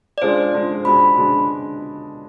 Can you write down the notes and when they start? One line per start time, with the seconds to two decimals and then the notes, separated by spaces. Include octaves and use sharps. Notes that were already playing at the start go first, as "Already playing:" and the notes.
0.18 D5
0.22 G#3 D4 F4 G#4 C5
0.54 G#3 D4 F4 G#4
0.85 B2 G#3 D4 B5
1.17 B2 G#3 D4